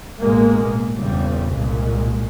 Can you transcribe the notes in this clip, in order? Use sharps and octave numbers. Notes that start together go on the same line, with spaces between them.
A1 B2 G#3 A#3
G1 E2 A#2 C#3 G3
C2 A#2 G#3